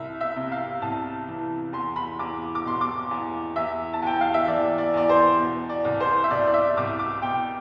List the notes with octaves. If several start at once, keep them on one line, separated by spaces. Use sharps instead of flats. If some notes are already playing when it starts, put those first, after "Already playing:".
Already playing: C2 E5
E5
C3
F5
C2 A5
E3
E2 C6
B5
E2 D6
D6
B2 C6
D6
E2
E2 E5
A5
E2 G5
F5
E5
E3 D5
D5
E2 D5
C5
B2
D5
C2
C5
E5
C2 D5
D5
E5
C2 D6
D6
B2 G5